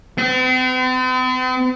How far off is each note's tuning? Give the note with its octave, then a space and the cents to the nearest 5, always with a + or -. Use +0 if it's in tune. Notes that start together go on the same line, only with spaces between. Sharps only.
C4 -45